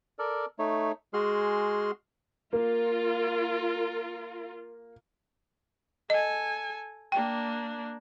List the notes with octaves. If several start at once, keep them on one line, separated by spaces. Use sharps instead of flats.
A4 A#4 D5
A3 D#4 C#5
G#3 F#4 G#4 C6 F6
A#3 F4 A#4
A4 D#5 G#5
A#3 D4 G5